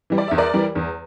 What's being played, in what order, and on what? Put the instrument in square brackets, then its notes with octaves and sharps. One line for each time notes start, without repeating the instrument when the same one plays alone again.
[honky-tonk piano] E3 G3
D5
E2 E5
A#4 D5
E3 G3
E2